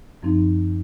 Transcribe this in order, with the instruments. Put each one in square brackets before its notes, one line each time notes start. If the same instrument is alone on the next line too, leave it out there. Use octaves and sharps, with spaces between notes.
[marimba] F#2 F3 C4 D#4